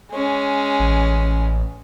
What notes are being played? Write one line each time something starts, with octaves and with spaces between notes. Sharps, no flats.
G#3 C#4
A1